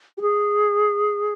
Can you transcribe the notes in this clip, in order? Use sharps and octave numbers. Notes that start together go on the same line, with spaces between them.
G4
G#4